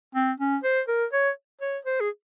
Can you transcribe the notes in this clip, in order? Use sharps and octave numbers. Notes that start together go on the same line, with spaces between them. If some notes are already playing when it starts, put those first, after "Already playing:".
C4
C#4
C5
A#4
C#5
C#5
C5
G#4